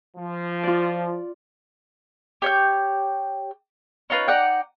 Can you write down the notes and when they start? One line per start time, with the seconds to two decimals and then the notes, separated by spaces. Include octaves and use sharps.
0.17 F3
0.63 F4 D5
2.42 G4 C#5 G5 G6
4.10 C#4 D#4 F4 B4
4.28 D#4 D5 F#5 G5